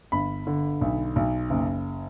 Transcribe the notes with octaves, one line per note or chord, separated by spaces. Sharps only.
G1 B5
D3
B1
B1
F#1